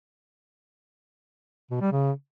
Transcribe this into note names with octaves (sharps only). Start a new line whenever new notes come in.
B2
G3
C#3